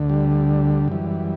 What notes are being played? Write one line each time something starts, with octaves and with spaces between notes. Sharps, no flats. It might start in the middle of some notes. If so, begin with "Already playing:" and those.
Already playing: D2 D3
G3
F#2 E3